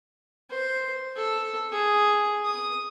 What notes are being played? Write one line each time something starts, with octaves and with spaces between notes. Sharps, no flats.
C5
A4
G#4
D#6